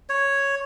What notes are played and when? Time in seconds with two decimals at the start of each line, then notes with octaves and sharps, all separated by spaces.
0.09 C#5